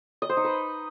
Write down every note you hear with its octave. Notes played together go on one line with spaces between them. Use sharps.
D#5
C5
D#4
B4